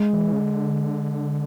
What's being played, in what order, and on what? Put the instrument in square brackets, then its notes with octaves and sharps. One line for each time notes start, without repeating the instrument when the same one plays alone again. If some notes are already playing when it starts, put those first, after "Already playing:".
Already playing: [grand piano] G#3
[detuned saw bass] E3
C#3
D3